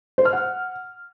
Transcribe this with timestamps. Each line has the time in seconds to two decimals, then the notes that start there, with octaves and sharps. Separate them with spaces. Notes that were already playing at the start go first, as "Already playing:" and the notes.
0.18 C5
0.25 F6
0.33 F#5